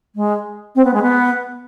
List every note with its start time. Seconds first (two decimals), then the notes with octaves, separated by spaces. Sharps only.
0.15 G#3
0.75 C4
0.84 B3
0.93 G#3
1.02 B3